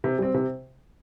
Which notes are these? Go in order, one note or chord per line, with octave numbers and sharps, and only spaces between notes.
C3
G3 C4
C3